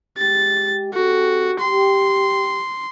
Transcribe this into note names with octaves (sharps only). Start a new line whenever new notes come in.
G#3 G4 A6
C4 F#4 G4 A4
G4 C6